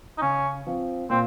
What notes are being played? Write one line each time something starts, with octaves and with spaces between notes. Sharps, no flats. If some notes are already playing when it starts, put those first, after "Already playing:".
D#4
C#3 C#4
F3 C4
A#2 C4